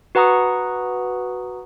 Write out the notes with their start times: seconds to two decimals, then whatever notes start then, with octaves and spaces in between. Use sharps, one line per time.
0.15 F#4 B4 F#5 A#5 C#6 D#6